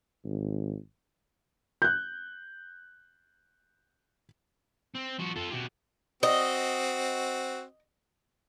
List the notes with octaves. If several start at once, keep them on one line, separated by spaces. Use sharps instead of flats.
G#1
F#6 G6
C4
F3 F#4
F4 A4
B2 G4
C4 F#4 D#5